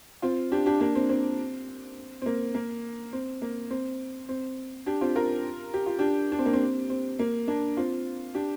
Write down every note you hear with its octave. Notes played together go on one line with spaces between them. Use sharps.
C4 F4
D4 G4
D4 G4
A#3 D4
C4
C4
C4
A#3
A#3
C4
A#3
C4
C4
D4 G4
C4 F4
F4 A#4
G4
F4
D4 G4
D4
C4
A#3
C4
C4
A#3
A#3 D4
C4 F4
D4 G4